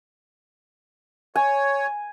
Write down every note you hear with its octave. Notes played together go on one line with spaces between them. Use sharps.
C#5 G#5